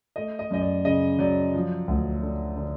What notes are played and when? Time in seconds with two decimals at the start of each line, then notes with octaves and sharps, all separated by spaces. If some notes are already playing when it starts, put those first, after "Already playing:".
0.16 A3 D#5
0.39 D#5
0.51 F#2 D#5
0.61 D5
0.85 C#3 D#5
1.19 F#3 D5
1.54 F3
1.88 D2
2.22 D3
2.57 D3